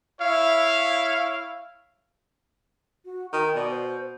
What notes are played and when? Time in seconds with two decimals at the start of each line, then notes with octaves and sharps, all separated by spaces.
0.20 E4 C#5 E5 F5
3.05 F#4
3.33 D#3 G5
3.55 B2 D5
3.71 C5